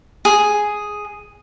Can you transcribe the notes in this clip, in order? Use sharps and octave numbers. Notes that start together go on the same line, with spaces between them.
G#4